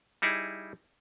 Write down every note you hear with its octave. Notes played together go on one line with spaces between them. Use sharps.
G3 D#4 E4 G#4